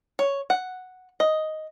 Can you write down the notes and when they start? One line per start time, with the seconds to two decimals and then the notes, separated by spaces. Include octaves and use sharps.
0.19 C#5
0.50 F#5
1.20 D#5